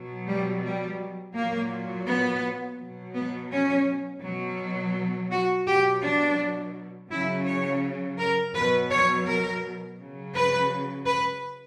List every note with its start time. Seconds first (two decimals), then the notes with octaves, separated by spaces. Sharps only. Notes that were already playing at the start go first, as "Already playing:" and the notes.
Already playing: B2 F#3
0.27 G3
0.63 G3
1.35 A#2 F#3 A#3
2.07 B3
2.79 B2 F#3
3.15 B3
3.51 C#4
4.23 B2 F#3
5.31 F#4
5.67 B2 F#3 G4
6.03 D4
7.11 C#3 F#3 E4
7.47 C#5
8.19 A#4
8.55 B2 F#3 B4
8.91 C#5
9.27 A#4
9.99 C#3 F#3
10.35 B4
11.07 B4